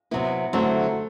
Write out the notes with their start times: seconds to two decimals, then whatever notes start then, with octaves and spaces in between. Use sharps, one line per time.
0.11 C3 F#3 B3 E4
0.53 D3 F#3 A3 C4 E4